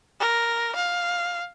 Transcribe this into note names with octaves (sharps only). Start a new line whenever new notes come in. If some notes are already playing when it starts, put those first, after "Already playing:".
A#4
F5